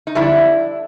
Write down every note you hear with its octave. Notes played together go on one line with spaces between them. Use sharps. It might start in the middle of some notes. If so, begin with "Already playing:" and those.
D#4
F2 D3 G3 D4 E4